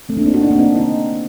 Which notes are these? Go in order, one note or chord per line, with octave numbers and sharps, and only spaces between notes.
A3 C4
A#3 D4
C4 D#4
D4 F#4
C4 D#4
A#3 D4
C4 D#4
C4 D#4